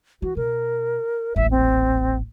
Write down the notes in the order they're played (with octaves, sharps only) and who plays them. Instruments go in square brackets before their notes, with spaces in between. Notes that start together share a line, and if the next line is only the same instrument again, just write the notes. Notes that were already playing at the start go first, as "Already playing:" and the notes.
[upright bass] E3 [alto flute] F#4
[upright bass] B2 [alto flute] A#4
[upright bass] D#1 A1 [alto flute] E5
[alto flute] C4